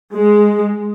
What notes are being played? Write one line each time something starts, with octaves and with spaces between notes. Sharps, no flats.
G#3